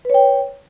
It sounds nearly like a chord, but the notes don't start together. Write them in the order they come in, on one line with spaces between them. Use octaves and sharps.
B4 C#5 G5